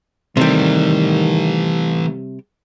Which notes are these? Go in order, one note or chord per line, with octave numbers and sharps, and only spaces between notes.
C3 D#3 E3 G3 A3